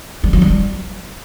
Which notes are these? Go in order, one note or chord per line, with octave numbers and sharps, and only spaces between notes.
G3
F#3
G3